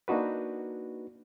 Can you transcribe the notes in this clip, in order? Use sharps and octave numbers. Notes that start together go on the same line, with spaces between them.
A#3 D4 D#4 F#4 B4